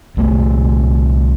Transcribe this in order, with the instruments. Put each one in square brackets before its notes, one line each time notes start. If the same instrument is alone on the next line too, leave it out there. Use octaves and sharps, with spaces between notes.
[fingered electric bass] C2 A3 B3